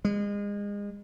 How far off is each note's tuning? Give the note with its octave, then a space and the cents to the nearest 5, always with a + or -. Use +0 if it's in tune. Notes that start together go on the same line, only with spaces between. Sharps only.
G#3 -30